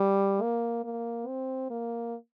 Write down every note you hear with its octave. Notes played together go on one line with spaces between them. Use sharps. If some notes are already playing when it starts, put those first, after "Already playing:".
Already playing: G3
A#3
A#3
C4
A#3